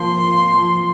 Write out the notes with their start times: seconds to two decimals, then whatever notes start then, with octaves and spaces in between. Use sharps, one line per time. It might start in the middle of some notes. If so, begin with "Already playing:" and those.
Already playing: F3 A#3 C6
0.24 F4
0.55 F3